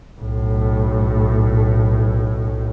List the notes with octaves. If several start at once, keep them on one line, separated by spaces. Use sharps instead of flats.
B1 A2